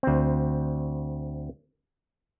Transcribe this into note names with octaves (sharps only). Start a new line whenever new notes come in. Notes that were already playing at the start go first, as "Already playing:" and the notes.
D2 C4